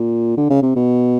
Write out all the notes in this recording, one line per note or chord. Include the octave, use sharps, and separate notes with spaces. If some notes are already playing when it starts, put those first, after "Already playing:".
Already playing: A#2
D3
C#3
C3
B2